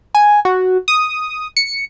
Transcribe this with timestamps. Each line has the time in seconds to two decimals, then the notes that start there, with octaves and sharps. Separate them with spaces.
0.15 G#5
0.45 F#4
0.88 D#6
1.57 C#7